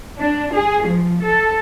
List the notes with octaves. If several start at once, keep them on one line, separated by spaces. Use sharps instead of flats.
D4
G#4
F3
A4